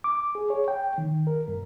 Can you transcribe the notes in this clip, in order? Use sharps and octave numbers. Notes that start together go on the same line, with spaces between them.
D6
G#4
C#5
G5
D#3
A#4
G2